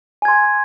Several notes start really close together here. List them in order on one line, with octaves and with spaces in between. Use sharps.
G#5 G#6 C6